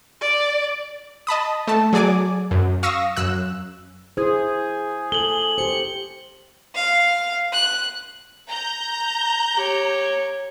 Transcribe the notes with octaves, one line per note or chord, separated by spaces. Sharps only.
D5
D#5 A5 B5 D#6
A3 A4 A5
F#3 G#4 D5 G#5 D6
F#2
F5 C#6 D#6 E6 A#6
F#2 E6 F#6
E4 G#4 C5
A4 F#7 G7
G4 C5 C#7
F5
F#6
A#5 G6
G4 C#5